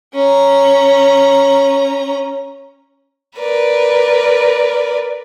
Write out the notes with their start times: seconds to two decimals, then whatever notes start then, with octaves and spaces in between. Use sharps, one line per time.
0.14 C#4 A#5
3.37 A#4 B4 D5